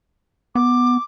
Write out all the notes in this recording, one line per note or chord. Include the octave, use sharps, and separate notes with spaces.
B3 D6